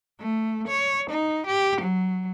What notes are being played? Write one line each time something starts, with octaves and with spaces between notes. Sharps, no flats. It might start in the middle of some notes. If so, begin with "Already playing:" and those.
A3
C#5
D#4
G4
F#3